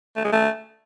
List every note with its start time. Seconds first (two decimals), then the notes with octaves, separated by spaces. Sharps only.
0.17 A3
0.25 G#3
0.33 A3